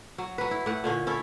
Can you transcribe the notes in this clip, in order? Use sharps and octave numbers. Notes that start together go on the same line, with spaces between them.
F#3
F#3 B4
E4
A2 F#5
A#2 D3 C#4
C#4 E4 A4